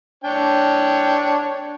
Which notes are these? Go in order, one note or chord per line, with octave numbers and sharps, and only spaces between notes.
D4 C#5 G5